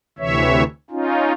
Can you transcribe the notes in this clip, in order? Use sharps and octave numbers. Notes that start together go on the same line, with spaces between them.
D2 C3 E3 C#5 E5
C#4 D#4 F4